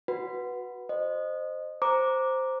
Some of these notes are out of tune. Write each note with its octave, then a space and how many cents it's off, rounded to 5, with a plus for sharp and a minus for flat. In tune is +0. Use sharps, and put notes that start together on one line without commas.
F#4 +0 B4 -5
C5 +0 D#5 -20
C5 +0 A#5 +0 D6 +0